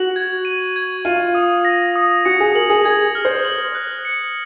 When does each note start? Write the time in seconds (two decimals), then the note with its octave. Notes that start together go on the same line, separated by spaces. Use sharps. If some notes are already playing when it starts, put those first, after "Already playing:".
Already playing: F#4 F#7
0.16 G#6
0.45 D#7
0.76 G#6
1.05 F4 D#7
1.35 D#6
1.65 A#6
1.96 D#6
2.25 F#4 C#7
2.40 G#4
2.55 A#4 F#7
2.70 G#4
2.85 G#4 G#6
3.15 F6
3.25 C5
3.45 F#7
3.75 F#6
4.05 C#7